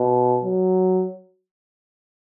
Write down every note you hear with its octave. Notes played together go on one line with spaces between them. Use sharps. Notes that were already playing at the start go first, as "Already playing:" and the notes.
Already playing: B2
F#3